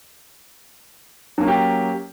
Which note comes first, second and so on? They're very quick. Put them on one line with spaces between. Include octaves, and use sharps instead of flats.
F#3 A#3 C#4 G4